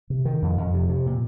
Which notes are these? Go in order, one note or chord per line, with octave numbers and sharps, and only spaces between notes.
C3
D#3
F2
F2
C3
C3
A#2